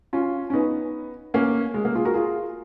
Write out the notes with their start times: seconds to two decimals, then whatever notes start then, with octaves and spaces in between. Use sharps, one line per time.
0.13 C#4 F4
0.50 C#4
0.53 B3 D#4
1.34 A#3 C#4
1.74 G#3
1.85 A#3
1.95 F4 G#4
2.05 F#4 A#4
2.14 F4 G#4